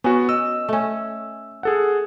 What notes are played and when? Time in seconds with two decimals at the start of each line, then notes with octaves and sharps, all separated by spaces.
0.04 B3 C#4 F#4
0.29 D#5 E6
0.68 A3 C#4
1.63 G#4 A4 F#5